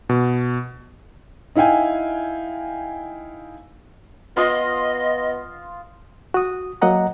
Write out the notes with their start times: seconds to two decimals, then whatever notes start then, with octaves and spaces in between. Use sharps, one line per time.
0.09 B2
1.55 D#4 E4 F5 G5 G#5
4.37 B3 F4 D#5 C6 D#6
6.34 F#4 D#6
6.82 F#3 A#3 D#5 F#5 A#5